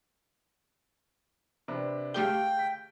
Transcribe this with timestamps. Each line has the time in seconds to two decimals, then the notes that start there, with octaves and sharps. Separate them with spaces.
1.68 C3 D4 B4
2.14 A3 G4 G#4 F5 G5 G7
2.59 B6